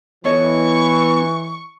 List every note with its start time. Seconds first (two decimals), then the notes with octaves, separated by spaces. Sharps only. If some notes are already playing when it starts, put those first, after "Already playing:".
0.25 E3 B3 E4 A4 C#5 D#5 C#6